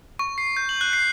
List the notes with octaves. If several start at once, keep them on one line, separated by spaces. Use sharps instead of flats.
C#6
C7
G6
F#7
F#6
C7